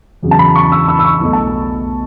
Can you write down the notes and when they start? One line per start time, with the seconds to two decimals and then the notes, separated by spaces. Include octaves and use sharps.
0.23 E2 C#3 F#3
0.31 A5
0.39 B5
0.56 C#6
0.72 E6
0.88 E6
0.99 E6
1.05 C#6
1.21 B1 B2 A3
1.33 A5